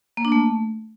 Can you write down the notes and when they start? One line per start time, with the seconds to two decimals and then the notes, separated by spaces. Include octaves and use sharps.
0.17 A#3
0.25 D4
0.32 A3